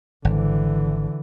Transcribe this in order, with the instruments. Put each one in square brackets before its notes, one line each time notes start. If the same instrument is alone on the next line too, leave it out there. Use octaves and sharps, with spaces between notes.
[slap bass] G#1 [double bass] D3 E3